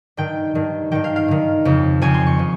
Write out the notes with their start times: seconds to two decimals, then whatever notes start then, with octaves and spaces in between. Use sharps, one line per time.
0.17 G2 D#3 G5
0.55 G2 D#3
0.91 G2 D#3 G5
1.04 F5
1.16 F5
1.28 G2 D#3
1.65 F2 C#3 F3
2.01 F2 C#3 F3 G#5
2.14 C6
2.27 C#6
2.39 C#3 F3